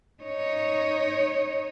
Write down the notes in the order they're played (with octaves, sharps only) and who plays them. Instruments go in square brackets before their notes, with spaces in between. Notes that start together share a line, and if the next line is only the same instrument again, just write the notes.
[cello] D#4 C#5